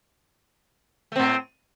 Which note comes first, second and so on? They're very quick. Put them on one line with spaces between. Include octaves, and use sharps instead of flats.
A3 C4 A2